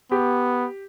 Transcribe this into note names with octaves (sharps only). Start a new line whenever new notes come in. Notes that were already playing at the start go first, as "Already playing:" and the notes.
B3 G4